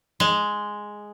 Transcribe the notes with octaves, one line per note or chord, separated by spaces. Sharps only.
G#3